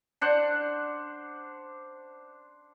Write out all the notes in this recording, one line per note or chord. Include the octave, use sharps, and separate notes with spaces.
D4 C5 F#5